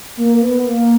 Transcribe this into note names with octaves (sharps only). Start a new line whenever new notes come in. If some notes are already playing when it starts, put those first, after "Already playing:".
A#3
B3
A#3